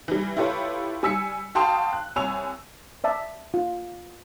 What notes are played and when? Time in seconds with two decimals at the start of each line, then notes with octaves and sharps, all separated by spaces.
0.08 E3 G3
0.37 E4 F4 G4 A4 B4 C#5
1.03 G3 G#5 E6 B6 C#7
1.55 F#4 F5 G5 A5 C6 D#6
1.93 F#6
2.16 C2 C#5 G#5 E6 F7
3.04 D5 E5 A5
3.54 F4